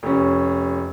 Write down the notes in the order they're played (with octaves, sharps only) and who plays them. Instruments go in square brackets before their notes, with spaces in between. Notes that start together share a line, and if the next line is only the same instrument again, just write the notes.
[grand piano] F1 C#4